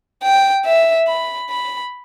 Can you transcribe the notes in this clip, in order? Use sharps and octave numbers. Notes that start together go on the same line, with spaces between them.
G5
E5
B5
B5